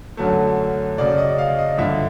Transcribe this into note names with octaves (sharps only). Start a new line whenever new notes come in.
F#2 D3 F#3 A3
F#2 C#3 F#3 D5
D#5
F5
D#5
G2 D3 F3 E5